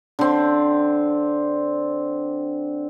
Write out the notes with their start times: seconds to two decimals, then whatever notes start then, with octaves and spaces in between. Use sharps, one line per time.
0.19 D3 C4